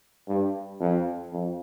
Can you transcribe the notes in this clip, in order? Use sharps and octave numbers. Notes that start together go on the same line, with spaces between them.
G2
F2
F2